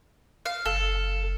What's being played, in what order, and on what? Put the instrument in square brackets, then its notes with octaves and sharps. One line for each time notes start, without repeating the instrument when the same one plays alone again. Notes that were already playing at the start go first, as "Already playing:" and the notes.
[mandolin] F5
[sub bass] F#1 [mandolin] A4